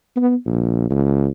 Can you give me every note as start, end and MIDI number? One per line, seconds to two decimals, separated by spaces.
0.16 0.35 59
0.46 0.88 34
0.90 1.28 37